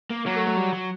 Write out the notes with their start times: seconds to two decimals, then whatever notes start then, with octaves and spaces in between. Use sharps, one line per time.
0.10 A#3
0.26 F#3 A#3
0.36 A3
0.47 A3
0.57 G3
0.73 F#3